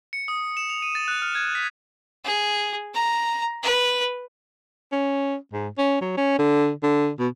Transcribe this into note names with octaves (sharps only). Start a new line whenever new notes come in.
C#7
D#6
E7
F7
D#7
A6
F#6
F6
G#6
B6
G#4
A#5
B4
C#4
G#2
C#4
F#3
C#4
D3
D3
B2